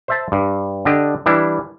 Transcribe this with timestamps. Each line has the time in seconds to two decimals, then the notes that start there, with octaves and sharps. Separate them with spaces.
0.08 C5 E5 A5
0.32 G2
0.85 D3 D4 G4 D#5
1.26 E3 G3 D4 E4